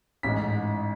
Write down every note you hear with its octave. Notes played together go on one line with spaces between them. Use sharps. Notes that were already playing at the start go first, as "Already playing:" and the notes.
A1 G#2 G#3 B6